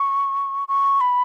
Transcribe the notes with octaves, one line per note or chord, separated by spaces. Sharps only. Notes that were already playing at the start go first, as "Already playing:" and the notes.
Already playing: C#6
C#6
B5